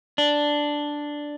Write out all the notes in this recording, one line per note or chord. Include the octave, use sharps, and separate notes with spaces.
D4